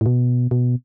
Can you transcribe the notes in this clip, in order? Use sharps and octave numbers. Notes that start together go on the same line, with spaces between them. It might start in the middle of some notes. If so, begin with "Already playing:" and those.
A2
B2
B2